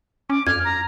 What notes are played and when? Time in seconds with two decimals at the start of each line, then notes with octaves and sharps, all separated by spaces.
0.30 C#4 D6
0.47 F2 F6 G#6
0.64 A#5